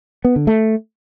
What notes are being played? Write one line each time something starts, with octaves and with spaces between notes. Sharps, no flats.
B3
D3
A3